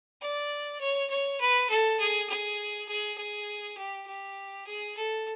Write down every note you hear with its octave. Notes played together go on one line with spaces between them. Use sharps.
D5
C#5
C#5
B4
A4
G#4
G#4
G#4
G#4
G4
G4
G#4
A4